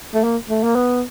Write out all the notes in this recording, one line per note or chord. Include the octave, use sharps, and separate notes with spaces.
A3
A#3
A3
A#3
B3